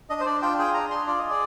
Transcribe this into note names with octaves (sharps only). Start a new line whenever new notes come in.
D4 D#5
C5
D4 D5
F4 G5
G#4 G5
D4 A#5
D4 C6
F4 D5
G#4 D#5
D5